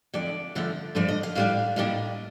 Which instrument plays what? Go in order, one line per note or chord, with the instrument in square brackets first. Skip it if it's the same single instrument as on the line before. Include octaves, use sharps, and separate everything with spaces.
[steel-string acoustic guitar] F2 D3 A3 D5
G2 D3 F3 A3
G2 D3 F3 A3 D5
D#5
F5
A2 G3 A#3 D4 F5
A2 G3 A#3 D4 D#5